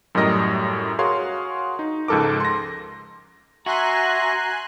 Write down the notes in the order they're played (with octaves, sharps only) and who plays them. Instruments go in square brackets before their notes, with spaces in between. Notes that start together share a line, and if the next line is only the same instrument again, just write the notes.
[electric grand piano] F#2 A2 G3 A#4 D#5 A#6
F#4 G#4 A#4 C#5 F5 C6
D#4
C#2 G#2 F3 A4 A#4 D6
C6 A#6
[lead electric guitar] F#4 [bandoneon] E5 C#6 [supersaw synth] G#5 C6 F#6 [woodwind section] A#5